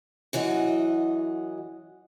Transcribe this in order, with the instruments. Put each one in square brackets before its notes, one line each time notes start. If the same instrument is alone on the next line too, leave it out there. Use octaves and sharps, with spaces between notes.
[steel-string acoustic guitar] F#2 E3 F#4 D#5